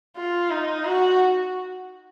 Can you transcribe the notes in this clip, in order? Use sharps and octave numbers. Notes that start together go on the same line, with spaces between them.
F4
D#4
F#4